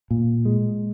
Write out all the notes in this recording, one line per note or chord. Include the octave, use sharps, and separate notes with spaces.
A#2
G#3